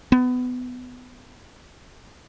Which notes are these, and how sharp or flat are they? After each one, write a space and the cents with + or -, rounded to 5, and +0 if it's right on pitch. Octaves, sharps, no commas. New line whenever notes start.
B3 +20